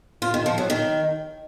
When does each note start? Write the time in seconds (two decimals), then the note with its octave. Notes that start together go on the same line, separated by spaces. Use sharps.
0.22 F4
0.34 D#3
0.46 F3
0.58 F#3
0.70 D#3